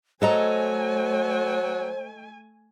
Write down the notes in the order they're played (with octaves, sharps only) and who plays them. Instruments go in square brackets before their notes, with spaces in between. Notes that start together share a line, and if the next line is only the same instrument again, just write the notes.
[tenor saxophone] F#3 [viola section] A3 G#5 [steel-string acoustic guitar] A4 D#5 A#5 [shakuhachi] C5